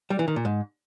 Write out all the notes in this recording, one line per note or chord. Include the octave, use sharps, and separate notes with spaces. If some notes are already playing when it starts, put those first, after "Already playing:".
G3
E3
D#3
A#2
G#2